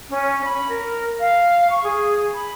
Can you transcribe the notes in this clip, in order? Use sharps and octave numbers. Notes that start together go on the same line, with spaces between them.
C#4
B5
A#4
F5
C#6
G#4
B5